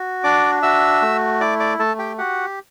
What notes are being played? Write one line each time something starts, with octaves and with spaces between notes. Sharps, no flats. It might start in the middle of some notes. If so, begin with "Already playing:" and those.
Already playing: F#4
D4 D5 D6
F#4 E5 E6
A3
E4 D5 D6
D5 D6
A3 A4 A5
G4 G5
F#4 G4 F#5